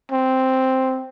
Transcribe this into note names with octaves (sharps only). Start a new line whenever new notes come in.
C4